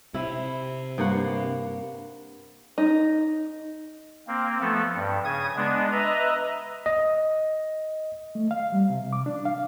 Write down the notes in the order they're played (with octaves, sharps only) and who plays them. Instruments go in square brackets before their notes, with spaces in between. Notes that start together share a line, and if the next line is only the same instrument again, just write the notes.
[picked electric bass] C3 [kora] E4
[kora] G2 A#3 F#5
[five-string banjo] D#4
[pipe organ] A#3 C4
F3 A3 B3 A4
G2
C#3 D#6 G#6
G#3 B3 D4
B4 D#5 E5 A#5
[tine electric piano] D#5
[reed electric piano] A3
F5
G3
C3
D6
D4
F5